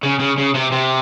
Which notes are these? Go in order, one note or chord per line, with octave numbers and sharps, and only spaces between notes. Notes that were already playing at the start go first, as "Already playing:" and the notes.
C#3
C#3
C#3
C3
C3